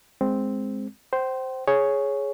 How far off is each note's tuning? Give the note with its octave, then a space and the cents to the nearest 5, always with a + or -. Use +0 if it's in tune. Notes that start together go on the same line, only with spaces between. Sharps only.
G#3 +0 C4 +0
C5 +0 G5 -35
G#4 +10 C#5 +0